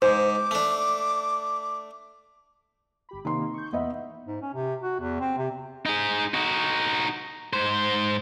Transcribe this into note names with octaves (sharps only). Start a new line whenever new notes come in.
G#2 C5 D6
A3 D4
G1 G4 B5
C3 D#3 A#3 D#4 C6
C#6 G6
E2 B3 D#5 E5 B5
G#2
C#4
C3
F#4
E2
C4
C3
D#4 G#4
D#4 F#4
G#2 C5